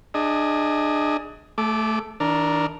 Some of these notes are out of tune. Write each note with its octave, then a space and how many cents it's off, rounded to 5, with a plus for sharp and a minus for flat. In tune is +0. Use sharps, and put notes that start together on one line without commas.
D4 +30 G#4 +0 D#5 +25
A3 +0 A4 -40 D6 +0
E3 -45 D4 +0 A#4 +0